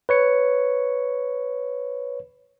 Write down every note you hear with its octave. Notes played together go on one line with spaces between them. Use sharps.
B4 C#5 C#7